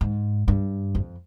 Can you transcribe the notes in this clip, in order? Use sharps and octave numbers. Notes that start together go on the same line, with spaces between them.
G#2
G2
F2